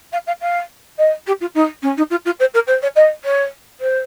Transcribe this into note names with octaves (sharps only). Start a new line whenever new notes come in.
F5
F5
F5
D#5
G4
F4
D#4
C#4
D#4
F4
F4
C5
A#4
C5
C#5
D#5
C#5
C5